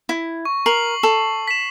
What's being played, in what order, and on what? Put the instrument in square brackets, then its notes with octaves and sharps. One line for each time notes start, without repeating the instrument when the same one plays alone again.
[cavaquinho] E4
[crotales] C#6
[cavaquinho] A#4 [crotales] C7 F#7
[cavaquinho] A4
[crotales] B6 E7